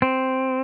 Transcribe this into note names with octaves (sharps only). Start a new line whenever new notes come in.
C4